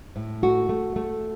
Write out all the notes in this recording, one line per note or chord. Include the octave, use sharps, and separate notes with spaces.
A2
A3 F#4
A3
A3